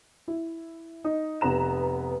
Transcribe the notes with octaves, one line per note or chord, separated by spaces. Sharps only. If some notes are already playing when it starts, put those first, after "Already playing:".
E4
D#4
F1 B3 B4 A#5 E7